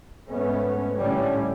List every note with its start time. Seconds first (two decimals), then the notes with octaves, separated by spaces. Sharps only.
0.29 G#2 A3 B3 C#4
0.98 A2 D3 G3 A3 C#4